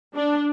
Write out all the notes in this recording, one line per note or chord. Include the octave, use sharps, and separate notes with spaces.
D4